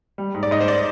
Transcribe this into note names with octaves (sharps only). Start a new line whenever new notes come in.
G3
G#2
D5
G#2 D#5
C5
D5